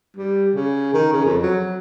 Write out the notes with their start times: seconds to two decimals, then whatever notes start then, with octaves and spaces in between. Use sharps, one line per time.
0.17 G3
0.55 C#3
0.94 D#3
1.13 C#3
1.25 F2
1.42 F#3